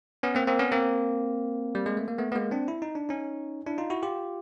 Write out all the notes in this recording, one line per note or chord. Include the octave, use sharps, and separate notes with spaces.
B3 C#4
A#3 C4
A#3 C4
B3 C#4
A#3 C4
G3
G#3
A3
A#3
A3 B3
B3
G#3 A#3
C4 D4
E4
D#4
D4
C#4 D#4
D4 E4
D#4 F4
E4 F#4
F4 G4